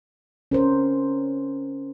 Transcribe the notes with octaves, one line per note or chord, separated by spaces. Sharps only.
C#4 A#4 C5